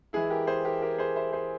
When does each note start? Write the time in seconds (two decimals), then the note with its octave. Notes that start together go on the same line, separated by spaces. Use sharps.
0.13 E3 G#3 E4 G#4
0.30 G4 A#4
0.47 G#4 C5
0.65 G4 A#4
0.82 G4 A#4
0.98 G#4 C5
1.16 C5 E5
1.33 G#4 C5